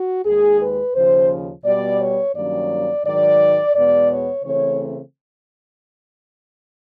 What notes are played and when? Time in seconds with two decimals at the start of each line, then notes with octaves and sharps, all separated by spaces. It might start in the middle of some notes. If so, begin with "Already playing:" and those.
Already playing: F#4
0.25 D#2 D#3 G#3 G#4
0.60 B4
0.94 D#2 C#3 F3 C5
1.64 B2 G3 B3 D5
1.99 C#5
2.35 G2 D#3 F#3 A#3 C#4 D5
3.04 G#2 D#3 F#3 D5
3.74 E2 B2 G#3 B3 D5
4.10 C#5
4.44 C#3 E3 A3 C4 C#5